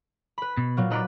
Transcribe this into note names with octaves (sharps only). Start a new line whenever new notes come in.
B4 B5
B2
A#2 F#3 A#3
D#4 A#4 B4 D5